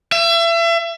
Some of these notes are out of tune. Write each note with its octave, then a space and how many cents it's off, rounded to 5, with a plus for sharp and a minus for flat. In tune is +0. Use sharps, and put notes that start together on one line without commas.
E5 +35